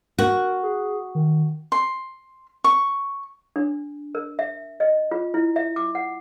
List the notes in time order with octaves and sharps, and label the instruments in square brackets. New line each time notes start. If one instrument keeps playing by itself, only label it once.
[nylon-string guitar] F#4 [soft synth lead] A#4
[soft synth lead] G#4
D#3
[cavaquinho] C6
C#6
[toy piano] D4
A#4
E5
D#5
F4
E4
E5
D6
F#5